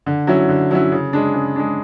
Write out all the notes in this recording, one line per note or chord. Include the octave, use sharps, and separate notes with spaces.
D3
F#3 C#4 E4
D3
F#3 C#4 E4
C#3
G#3 D4
C#3
G#3 D4